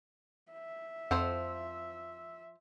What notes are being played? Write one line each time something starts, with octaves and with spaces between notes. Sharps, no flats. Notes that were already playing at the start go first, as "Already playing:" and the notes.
E5
F2 F3 C5 F#5 E6